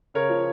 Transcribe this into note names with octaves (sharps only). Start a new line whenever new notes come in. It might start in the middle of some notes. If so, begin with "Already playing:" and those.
C#3 A#4 C#5
F3